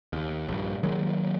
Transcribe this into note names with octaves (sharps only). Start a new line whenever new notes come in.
D#2
A#1 G2
D#3 F#3 G#3 A#3